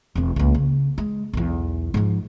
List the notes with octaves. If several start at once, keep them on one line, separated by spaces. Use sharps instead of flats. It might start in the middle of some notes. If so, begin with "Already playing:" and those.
E1 C4
C#2 A#3
C#3
G#3
B1 E2
G#2 F3